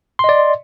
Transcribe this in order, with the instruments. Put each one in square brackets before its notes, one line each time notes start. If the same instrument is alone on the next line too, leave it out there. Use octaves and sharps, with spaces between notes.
[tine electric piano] C6
D#5
D5